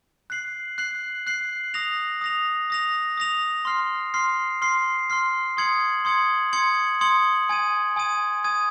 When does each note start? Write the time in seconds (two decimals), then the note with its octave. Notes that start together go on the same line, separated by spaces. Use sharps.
0.30 F#6 C7 F#7
0.78 F#6 C7 F#7
1.27 F#6 C7 F#7
1.74 D#6 A#6 F7
2.21 D#6 A#6 F7
2.70 D#6 A#6 F7
3.17 D#6 A#6 F7
3.65 C6 F6 C7
4.14 C6 F6 C7
4.62 C6 F6 C7
5.10 C6 F6 C7
5.57 C6 D#6 G#6 C#7 F#7
6.05 C6 D#6 G#6 C#7 F#7
6.53 C6 D#6 G#6 C#7 F#7
7.01 C6 D#6 G#6 C#7 F#7
7.49 G#5 D#6 G#6 D#7
7.96 G#5 D#6 G#6 D#7
8.44 G#5 D#6 G#6 D#7